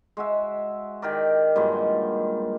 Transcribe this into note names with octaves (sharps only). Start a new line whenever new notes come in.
G#3 F#4 E5
D#3 G4 A#4 D5
G2 A#2 F#3 G#3